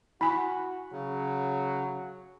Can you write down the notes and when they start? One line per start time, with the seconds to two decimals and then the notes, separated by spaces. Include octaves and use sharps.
0.21 E4 F#4 G#5 B5
0.92 C#3 F#3